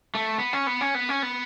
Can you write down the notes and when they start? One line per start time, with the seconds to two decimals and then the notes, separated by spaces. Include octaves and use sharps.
0.15 A3
0.38 B3
0.53 C#4
0.67 B3
0.81 C#4
0.95 B3
1.09 C#4
1.23 B3